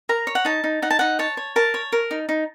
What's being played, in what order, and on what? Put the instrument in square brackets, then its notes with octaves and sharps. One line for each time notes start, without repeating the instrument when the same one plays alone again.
[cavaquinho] A#4 A#5
C#5
F#5
D#4 A5
D#4
D#4 F#5
A5
D#4 F#5
C#5 A5
C#5
A#4 A5
C#5
A#4
D#4
D#4